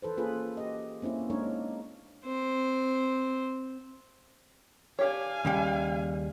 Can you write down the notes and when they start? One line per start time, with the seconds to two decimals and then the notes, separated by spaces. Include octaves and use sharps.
0.02 E3 A4 B4 C5
0.17 A#3 C#4 F4 G#4 A4 B4
0.57 G4 D#5
1.02 A#3 C4 C#4 E4
1.30 G#3 A#3 D4 D#4 A#4 C#5
2.26 C4 C5
4.99 D4 G4 C#5 F5 G#5
5.45 D#2 C#3 G3